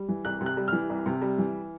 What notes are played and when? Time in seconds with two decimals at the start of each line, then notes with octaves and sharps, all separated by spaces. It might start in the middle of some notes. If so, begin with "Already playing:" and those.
Already playing: G3
0.09 E3
0.25 C2 F#6
0.41 C3
0.46 F#6
0.57 G3
0.68 E3 F6
0.89 C2
1.06 C3
1.22 G3
1.38 E3